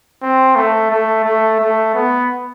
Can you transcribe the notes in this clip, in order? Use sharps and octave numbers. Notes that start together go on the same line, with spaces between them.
C4
A3
A3
A3
A3
B3